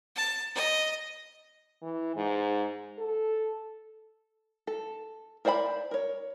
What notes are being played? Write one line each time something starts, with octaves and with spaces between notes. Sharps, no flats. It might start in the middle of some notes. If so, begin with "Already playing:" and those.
A5
D#5
E3
G#2
A4
A4
A#4 C5 D5 G5 B5
A#4 C#5